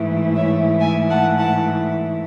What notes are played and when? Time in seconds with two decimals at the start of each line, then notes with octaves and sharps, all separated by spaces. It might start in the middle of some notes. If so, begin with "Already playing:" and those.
Already playing: G#2 E3 A3 E4
0.35 C#5 E5
0.79 E5 G#5
1.09 F#5 A5
1.39 F#5 A5